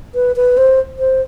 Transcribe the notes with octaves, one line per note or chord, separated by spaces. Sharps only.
B4
B4
C5
C5